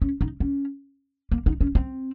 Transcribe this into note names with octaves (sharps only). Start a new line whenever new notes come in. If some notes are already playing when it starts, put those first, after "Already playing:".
C#4
D#4
C#4
A#3
D#4
C#4
C4